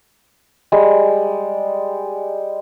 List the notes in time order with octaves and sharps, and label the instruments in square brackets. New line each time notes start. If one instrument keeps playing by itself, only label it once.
[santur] G3 G#3 D5